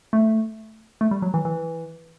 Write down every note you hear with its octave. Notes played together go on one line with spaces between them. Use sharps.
A3
A3
G3
F#3
E3
E3